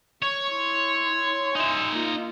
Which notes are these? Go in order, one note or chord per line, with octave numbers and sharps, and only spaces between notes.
C#5 C#6
E4 C6
D#4 E5 G#5 C6
A#3 F4